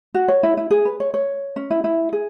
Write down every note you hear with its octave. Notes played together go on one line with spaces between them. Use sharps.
F#4
C#5
E4
E4
G#4
B4
C#5
C#5
C#4
E4
E4
G#4